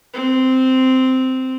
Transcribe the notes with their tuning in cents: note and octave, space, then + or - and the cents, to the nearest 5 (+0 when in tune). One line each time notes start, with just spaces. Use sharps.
C4 -10